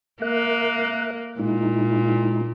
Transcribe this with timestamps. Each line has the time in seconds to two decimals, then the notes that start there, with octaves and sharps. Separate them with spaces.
0.22 A#3 A#4 E5 F#6
1.39 A#2 G#3 D#4 E4